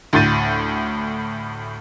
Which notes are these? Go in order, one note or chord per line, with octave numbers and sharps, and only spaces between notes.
D2 A2 G6 A6 D#7